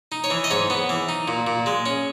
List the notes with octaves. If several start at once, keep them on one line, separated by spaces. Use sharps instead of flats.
D#4
C#5
E3
D#5
G#2 C#5
B3
E3
D#4
A#2
A#2
G#3
C#4